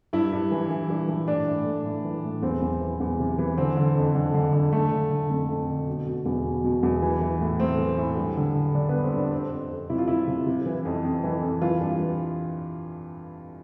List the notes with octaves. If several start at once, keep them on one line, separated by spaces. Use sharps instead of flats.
G2 E4
G2
E3
E3
G2
E3
A2 D4
A2
A2
A2
E3
A2
E2 C4
E2
E3
E2
C3
E3
D3 C4
D3
F2
D3
D3
D3
D3 A3
D3
D3
F2 A3
F2
D3
B2
B2
E2
B2
B2
E2
E3
E3
A2
A2 C4
E3
A2
G2
D3
D3
D3 D4
B3
G2
C4
G2 D4
F2 C4
F2
F2
C3 E4
F4
C3 E4
C3
C3
E3
F2
F2
E3
F2
E3 F4
G2
E3